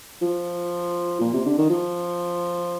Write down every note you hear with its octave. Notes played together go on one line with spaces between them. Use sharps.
F3
A#2
C3
D3
D#3
F3